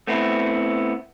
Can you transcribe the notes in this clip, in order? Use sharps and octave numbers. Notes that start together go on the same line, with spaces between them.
A3 B3 C4 E4